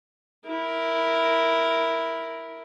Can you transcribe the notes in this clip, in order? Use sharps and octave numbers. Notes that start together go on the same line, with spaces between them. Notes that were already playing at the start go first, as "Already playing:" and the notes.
E4 A#4